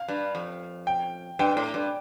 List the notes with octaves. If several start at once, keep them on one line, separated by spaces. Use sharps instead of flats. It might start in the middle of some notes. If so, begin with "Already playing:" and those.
Already playing: F5
G2
F2
G5
G2 G5
A2
G2